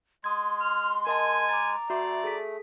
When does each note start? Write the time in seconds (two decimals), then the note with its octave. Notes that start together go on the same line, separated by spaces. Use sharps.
0.24 G#3 C6 D#6 G#6
0.61 F6
1.07 A#4 D#5 G#5 A5
1.49 A#5 D6 A6
1.90 A3 F#4 D5 E5 C6
2.24 G#4 A4 B6